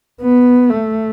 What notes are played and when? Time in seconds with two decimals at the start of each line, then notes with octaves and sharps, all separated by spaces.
0.22 B3
0.70 A3